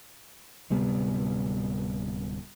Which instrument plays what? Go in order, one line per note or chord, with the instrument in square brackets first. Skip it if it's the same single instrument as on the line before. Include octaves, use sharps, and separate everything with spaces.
[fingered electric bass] D1 C3 G3 B3